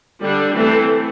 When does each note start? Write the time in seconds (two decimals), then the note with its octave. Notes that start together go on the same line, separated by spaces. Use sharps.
0.22 D3 G3 D4
0.54 E3 A3 C4 A4